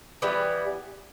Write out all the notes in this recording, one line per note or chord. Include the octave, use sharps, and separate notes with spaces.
E3 G3 B3